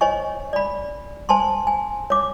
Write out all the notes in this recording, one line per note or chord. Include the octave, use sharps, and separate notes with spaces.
C5 C#5 D#5 G#5 C#6
D5 B5
C5 G#5 A5 C6
G#5
C#5 D6